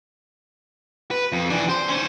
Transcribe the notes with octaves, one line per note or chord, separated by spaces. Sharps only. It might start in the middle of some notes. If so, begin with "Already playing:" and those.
B4
F2
E3 D4
C5
C#4 C5